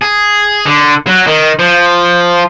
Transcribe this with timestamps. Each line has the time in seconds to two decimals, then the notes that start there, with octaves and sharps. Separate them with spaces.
0.02 G#4
0.66 D3
1.07 F#3
1.27 D#3
1.59 F3